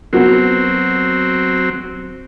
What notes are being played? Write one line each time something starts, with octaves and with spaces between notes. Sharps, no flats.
F#3 B3 C4 F#4 A#4